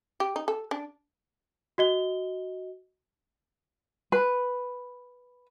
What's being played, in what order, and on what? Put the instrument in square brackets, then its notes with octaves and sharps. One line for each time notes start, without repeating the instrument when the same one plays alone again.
[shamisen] G4
D#4
A4
D4
[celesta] F#4 D#5 G7
[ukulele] B4